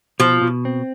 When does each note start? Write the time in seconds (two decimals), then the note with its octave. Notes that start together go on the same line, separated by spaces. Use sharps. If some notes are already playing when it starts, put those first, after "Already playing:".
0.20 B2 F3
0.42 B2
0.65 C4